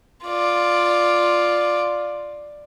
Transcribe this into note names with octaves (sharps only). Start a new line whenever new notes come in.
F4 D5